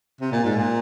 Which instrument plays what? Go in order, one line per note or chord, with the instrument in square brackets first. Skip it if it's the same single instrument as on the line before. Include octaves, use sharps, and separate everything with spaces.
[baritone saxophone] C3
A#2
G#2
A#2